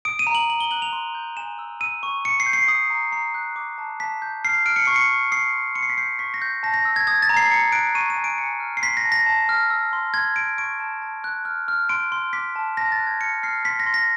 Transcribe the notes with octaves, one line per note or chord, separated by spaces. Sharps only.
D#6 D7
D#7
A#5
F#7
A#5 F#7
G7
F#6 F#7
F7
C6
G6
G#5 E7
E6
E6 D#7
C#6
C#6 C#7
C7
G6
C7
D#6
A#5
A#5 C7
F#6
D6
A5
A5 B6
G6
F6 C7
F6 D7
C#7
C#6 C7
C#7
C#6
D#6 C7
C6
C6 C#7
C7
B6
G6 C7
C#6 B6
A#6
G6
A5 A#6
A#6
E6
G#6
D#6 G#6
A6
A#5
C7
A#5 C#7
F#6 D7
C#6 D#7
D#7
G#5
D7
G#5 C#7
F6
C7
C6 B6
A#6
A5
A#6
A5
F6
E6
C6
C6 G#6
G6 D7
C#6 D7
A5
A5
F#6
F6
F6
C6 D7
C6
D6 B6
A5
A5 A#6
A6
F#6
G#6
F6 C#7
F6 C7
C6 B6
A#6
C6
A#6